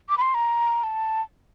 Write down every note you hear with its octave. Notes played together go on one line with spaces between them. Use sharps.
D6
B5
C6
A#5
A5